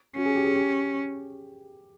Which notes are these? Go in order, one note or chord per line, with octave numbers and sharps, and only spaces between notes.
C#4 F#4
G#4
G4
G#4
G4